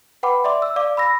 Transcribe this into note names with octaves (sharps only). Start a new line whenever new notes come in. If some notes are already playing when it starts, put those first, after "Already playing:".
B4 F#5 G5 B5 D6
D5 E5 C6 D6
E6
D5 F5 D6
B5 E6 A#6